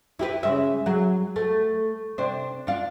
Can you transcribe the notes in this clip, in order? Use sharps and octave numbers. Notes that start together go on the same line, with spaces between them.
E4 G4 B4
C#3 G#3 E5
F#3 G#4
A3
C3 D4 C5
D4 F4